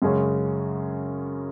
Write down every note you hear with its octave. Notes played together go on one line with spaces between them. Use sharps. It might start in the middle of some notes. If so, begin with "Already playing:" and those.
F#2 C#3 G#3 C#4 G#4